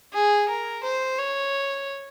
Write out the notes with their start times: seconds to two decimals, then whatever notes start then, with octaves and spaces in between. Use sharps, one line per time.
0.13 G#4
0.49 A#4
0.84 C5
1.18 C#5